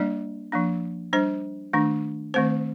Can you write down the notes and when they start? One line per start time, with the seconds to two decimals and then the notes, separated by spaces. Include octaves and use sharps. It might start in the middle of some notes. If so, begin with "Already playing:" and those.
Already playing: G3 A#3 D4 D5
0.52 F3 A#3 D4
1.13 G3 D4 C5
1.73 D#3 A3 D4
2.34 D#3 A3 C4 C5